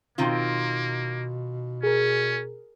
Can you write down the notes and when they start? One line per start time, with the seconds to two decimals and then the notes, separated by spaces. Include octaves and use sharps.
0.18 B2 D#3 A#3 C4 F4
1.83 C#4 G#4 A#4